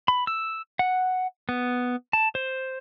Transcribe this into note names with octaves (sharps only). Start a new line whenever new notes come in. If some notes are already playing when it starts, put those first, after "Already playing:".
B5
E6
F#5
B3
A5
C5